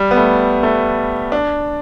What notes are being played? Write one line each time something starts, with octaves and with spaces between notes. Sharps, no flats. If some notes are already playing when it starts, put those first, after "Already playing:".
Already playing: G3
B3
A3
A3
D4